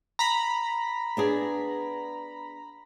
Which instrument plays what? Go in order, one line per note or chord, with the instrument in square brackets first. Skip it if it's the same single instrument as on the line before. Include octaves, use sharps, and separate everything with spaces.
[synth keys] A#5 B5
[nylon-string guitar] B3 D4 G#4